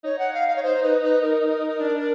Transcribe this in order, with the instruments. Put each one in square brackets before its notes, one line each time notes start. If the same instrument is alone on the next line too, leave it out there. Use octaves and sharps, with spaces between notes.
[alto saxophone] D#4 [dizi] C#5
[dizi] F#5
F5
F5
C#5
C5
B4
B4
A#4
[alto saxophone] D4